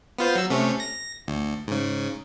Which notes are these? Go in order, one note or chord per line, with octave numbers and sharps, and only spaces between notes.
B3 F4 C5
F#3 E6
C3 A3 C#4
A#6
D2
G#2 C#3